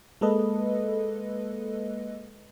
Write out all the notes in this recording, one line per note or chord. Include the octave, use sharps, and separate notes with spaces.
G#3 A#3 A4 B4 D#5